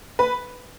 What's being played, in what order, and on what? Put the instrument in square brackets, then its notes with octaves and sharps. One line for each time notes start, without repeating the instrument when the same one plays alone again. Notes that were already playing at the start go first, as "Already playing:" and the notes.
[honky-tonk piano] B4